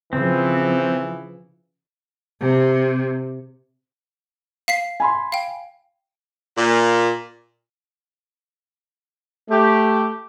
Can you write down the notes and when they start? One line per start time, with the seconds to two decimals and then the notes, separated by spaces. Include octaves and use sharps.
0.13 C#3 E3 F3 C4
2.41 C3
4.68 F5 B6 C7
5.00 G#5 B5 C6
5.32 F5 G5
6.57 A#2
9.50 A3 G4